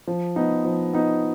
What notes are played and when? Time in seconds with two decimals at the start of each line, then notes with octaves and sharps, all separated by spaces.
0.07 F3
0.36 B3 D#4
0.65 F3
0.93 B3 D#4